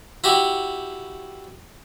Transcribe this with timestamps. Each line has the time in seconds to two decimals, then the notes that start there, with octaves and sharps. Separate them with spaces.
0.24 E4 F#4 G4